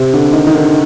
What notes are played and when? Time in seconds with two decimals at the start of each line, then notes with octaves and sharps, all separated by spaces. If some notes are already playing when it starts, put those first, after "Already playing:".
Already playing: C3
0.13 D3
0.33 D#3
0.47 D#3
0.53 D3